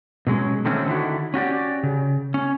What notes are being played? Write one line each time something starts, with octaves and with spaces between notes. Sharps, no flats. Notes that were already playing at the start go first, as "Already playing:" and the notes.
B2 F#3 G#3 C#4
D3 D#3 A3 C4 C#4
D3 D#3 E4 F#4
C#4 F#4 G4 D5
C#3
C#4